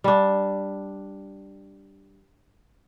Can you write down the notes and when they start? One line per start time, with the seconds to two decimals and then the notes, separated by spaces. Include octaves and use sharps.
0.04 G3 D4